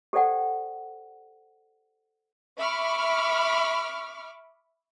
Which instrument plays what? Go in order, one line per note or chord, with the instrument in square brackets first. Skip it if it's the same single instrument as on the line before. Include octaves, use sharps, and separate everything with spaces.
[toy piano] G4 A4 C5 D5 F#5 G5
[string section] E5 B5 C#6 D6 F6